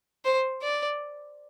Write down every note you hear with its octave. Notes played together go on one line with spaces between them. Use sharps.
C5
D5